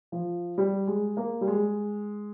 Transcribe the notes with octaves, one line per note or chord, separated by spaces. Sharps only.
F3
G3
G#3
A#3
G3
G#3